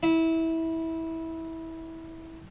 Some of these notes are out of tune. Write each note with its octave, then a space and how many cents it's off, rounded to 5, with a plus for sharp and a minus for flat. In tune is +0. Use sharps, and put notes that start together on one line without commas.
E4 -20